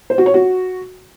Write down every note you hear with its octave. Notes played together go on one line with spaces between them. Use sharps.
C5
F#4
C#5
F#4